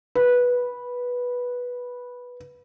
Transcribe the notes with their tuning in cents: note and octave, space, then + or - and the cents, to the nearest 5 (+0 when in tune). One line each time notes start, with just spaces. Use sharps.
B4 -10